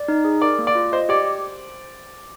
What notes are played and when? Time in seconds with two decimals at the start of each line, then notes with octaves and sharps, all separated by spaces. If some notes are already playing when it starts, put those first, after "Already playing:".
Already playing: D5
0.08 D#4
0.25 G#4
0.42 A#4 D5
0.59 A#3
0.67 D5
0.75 F4
0.92 C5 D#5
1.09 G4 D5